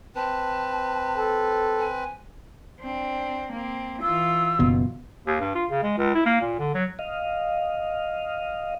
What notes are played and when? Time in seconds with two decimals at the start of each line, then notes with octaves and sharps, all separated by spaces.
0.16 C4 B4 A5
1.17 A4
1.79 G#5
2.81 C4 D4
3.53 A#3 C4
4.02 E3 F4 E6
4.59 F#1 B2
5.27 D#2
5.40 G2
5.55 F4
5.70 C#3
5.83 G#3
5.98 C#2
6.15 E4
6.26 A#3
6.41 A#2
6.59 D3
6.75 F#3
6.99 D#5 F5